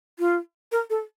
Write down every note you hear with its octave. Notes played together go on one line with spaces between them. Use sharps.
F4
A#4
A4